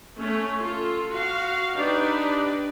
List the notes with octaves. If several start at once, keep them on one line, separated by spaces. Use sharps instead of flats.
A3 C#4
F4 A4
F#4 F5
D4 D#4 G4 B4 D5